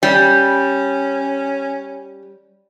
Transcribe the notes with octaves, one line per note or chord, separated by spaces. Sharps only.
G3 C#4